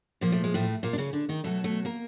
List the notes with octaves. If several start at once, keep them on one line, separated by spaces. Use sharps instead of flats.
A#2 F3 A#3
A3
G#3
A2 A3
A#2 A#3
D4
C#3 C#4
D3 D4
D#3 D#4
B2 F#3 A3 A4
A3 A4
A#3 A#4